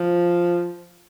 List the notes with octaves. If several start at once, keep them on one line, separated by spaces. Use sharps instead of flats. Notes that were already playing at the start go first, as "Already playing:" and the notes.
Already playing: F3